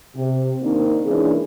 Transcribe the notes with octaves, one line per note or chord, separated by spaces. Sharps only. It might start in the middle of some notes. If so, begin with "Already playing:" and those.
C3
D#3 A#3 C4 D4 D#4
C#3 E3 G#3 A#3 D4 G#4